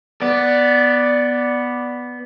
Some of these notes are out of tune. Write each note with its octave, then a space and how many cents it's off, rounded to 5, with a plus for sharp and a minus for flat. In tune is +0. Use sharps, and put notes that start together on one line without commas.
B3 +0 D5 +0